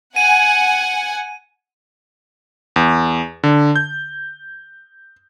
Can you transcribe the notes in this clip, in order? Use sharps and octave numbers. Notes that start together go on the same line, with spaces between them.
F#5 G#5 D#7
E2
D3
G6